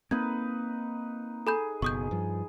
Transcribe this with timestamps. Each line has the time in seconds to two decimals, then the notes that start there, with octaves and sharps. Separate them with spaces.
0.11 A#3 C4 D#4 B4 G#6
1.47 G#4 A4 B5 G6
1.82 F#1 B2 C#6 D#6 G6
2.11 G2 F3